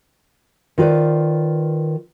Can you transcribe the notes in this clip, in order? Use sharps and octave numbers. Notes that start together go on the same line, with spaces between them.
D#3 F4 B4 C5 D5